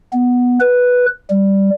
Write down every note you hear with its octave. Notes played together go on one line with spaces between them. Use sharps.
B3
B4
G3